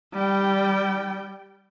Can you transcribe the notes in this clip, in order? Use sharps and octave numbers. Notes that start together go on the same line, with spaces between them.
G3 G5